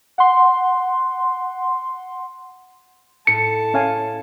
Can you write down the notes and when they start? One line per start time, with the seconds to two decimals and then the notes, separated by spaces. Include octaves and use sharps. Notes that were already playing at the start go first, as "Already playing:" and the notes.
0.18 F#5 C6
3.27 A2 A5 C#7
3.74 C#4 F5 G#5